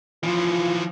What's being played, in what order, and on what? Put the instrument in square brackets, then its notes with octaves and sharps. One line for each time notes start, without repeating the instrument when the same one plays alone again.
[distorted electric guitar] E3 F3 [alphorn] F4